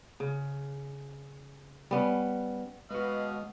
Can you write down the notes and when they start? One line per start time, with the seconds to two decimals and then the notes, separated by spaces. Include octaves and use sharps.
0.20 C#3
1.91 G3 B3 C#4
2.91 B2 G#3 F#4 B4 D#5 F5